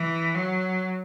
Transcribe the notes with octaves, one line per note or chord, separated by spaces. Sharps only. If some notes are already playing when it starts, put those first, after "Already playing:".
Already playing: E3
F#3